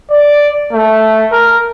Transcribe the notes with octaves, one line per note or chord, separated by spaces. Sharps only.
D5
A3
A#4